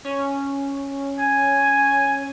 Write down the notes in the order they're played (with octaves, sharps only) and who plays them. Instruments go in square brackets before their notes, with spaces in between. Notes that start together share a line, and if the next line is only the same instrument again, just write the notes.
[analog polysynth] C#4
[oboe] G#5